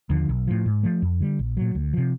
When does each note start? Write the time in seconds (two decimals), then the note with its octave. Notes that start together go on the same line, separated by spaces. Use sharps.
0.10 D#2 D3 F3
0.29 B1
0.48 A2 F3
0.66 G#2
0.83 F3 A3
1.02 F2
1.20 D3 G3
1.39 A#1
1.57 A#2 F#3
1.75 D2
1.93 C3 F3